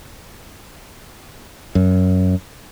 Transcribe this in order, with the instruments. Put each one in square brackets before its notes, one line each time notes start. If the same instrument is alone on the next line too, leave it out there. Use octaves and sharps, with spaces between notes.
[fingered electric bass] F#2